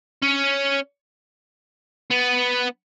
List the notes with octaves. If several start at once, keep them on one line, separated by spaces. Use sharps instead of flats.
C#4
B3